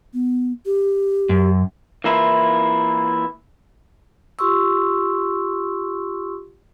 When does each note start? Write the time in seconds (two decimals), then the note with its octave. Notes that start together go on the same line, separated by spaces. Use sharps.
0.14 B3
0.66 G4
1.29 F#2
2.04 E3 A#3 E4 F4
4.39 F4 G4 C6 C#6 E6